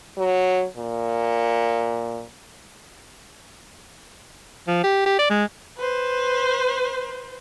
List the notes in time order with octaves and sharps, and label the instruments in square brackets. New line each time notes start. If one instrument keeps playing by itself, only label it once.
[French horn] F#3
A#2
[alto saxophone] F3
G4
G4
D5
G#3
[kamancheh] B4 C5